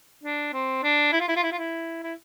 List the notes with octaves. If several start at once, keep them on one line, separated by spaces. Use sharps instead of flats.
D4
C4
D4
E4
F4
E4
F4
E4
F4
E4
E4